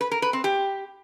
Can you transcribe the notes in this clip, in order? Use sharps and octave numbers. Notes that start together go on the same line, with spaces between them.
B4
A#4
B4
C4
G4